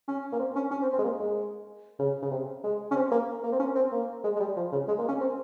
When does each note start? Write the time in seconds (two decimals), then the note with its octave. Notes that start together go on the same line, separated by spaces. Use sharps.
0.08 C#4
0.33 A#3
0.39 C4
0.56 C#4
0.71 C#4
0.82 C4
0.93 C4
0.99 G#3
1.04 A#3
1.19 G#3
1.99 C#3
2.22 C#3
2.31 C3
2.64 G#3
2.91 C#4
2.96 C4
3.12 A#3
3.44 A#3
3.52 C4
3.60 C#4
3.76 C4
3.92 A#3
4.24 G#3
4.36 G#3
4.40 G3
4.57 F3
4.72 C#3
4.88 G#3
4.99 A#3
5.09 C#4
5.21 C4